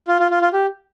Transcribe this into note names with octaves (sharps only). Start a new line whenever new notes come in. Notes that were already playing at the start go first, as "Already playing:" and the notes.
F4
F4
F4
F4
G4